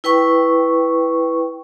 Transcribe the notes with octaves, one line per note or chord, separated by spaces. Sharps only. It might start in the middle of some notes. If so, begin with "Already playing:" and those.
E4 B4 G5 C#6